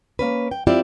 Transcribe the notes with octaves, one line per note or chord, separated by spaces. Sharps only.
A#3 C#4 B4
G5
C4 E4 F4 G4 D5